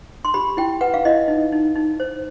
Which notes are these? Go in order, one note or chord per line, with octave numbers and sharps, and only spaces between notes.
C6
G4 B5
E4 G5
B4 F#5
F5
E4 D#5
D#4
D#4
D#4
C5